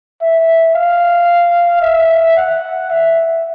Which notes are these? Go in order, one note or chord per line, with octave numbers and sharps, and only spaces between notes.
E5
F5
E5
F#5
E5